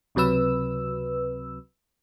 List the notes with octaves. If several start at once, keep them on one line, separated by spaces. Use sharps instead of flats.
C#2 C3 F#3 B4 E6